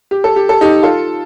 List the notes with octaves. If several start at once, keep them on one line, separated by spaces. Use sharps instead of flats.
G4
A4
G4
A4
D#4 G4
F4 A4